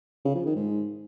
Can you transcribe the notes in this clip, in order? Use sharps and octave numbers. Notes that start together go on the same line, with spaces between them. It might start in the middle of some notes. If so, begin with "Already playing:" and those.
C#3
F3
D#3
G#2